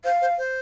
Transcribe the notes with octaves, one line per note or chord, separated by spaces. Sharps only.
C5 F5
C5
C5